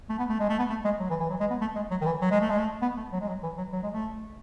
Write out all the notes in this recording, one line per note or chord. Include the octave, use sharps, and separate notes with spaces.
A3
B3
A3
G#3
A3
B3
A3
G#3
F#3
E3
E3
F#3
G#3
B3
A3
G#3
F#3
D#3
E3
F#3
G#3
A3
G#3
A3
B3
A3
F#3
G#3
F#3
E3
F#3
F#3
G#3
A3